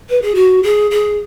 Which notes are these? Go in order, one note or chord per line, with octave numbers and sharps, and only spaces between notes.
B4
G#4
F#4
G#4
G#4